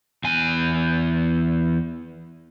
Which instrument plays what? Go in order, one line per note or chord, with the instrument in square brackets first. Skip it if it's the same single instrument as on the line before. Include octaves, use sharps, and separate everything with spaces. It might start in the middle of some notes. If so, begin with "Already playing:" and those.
[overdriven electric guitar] E2 G#5